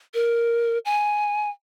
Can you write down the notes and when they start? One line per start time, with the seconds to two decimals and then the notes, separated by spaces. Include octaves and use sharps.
0.14 A#4
0.85 G#5